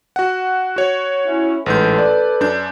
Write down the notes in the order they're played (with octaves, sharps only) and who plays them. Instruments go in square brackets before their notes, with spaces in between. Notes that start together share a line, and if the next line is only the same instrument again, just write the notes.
[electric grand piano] F#4 F#5
F#4 C#5
[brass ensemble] C#4 E4
[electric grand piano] A1 G#2 G6 [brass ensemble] A4 B4
[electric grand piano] D5
F#2 D4 G6